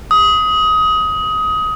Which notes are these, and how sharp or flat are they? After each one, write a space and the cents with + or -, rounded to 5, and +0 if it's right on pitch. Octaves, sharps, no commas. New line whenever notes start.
D#6 +20